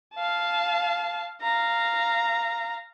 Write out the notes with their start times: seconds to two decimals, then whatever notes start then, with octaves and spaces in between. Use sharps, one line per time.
0.15 F5 A5
1.42 F5 A#5